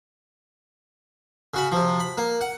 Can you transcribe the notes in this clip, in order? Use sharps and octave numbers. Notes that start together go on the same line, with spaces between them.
C#3 F#4 B5
C3 F3
B5
A#3
F#5